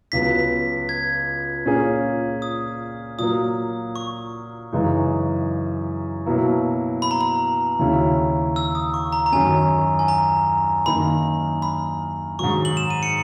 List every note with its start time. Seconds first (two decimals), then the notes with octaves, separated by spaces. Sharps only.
0.12 C#2 C#3 F#3 B3 B6
0.89 G#6
1.65 A#2 A#3 C#4 G#4
2.42 D#6
3.18 A#2 F#3 A#3 D#6
3.96 C#6
4.72 F#2 C#3 E3 G#3 D#4
6.26 B2 F#3 A#3 E4
7.02 B5
7.11 A#5
7.21 B5
7.79 D#2 C#3 F#3 C#4 E4
8.56 E6
8.75 D#6
8.94 C#6
9.13 A#5
9.26 A#5
9.32 F#2 D#3 F#3 C#4 G#5
9.99 G#5
10.08 A#5
10.86 F#2 D#3 A#3 D#4 B5
11.62 B5
12.39 G#2 D#3 F#3 C#6
12.65 F#7
12.77 E7
12.90 D#7
13.03 C#7